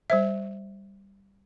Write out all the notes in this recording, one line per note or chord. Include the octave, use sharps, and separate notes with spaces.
G3 C5 E5